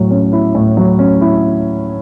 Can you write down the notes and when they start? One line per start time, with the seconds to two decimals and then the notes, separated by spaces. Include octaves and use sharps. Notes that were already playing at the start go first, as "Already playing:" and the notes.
Already playing: A2 F#3
0.11 C#4
0.33 E4
0.55 A2
0.77 F#3
0.99 C#4
1.21 E4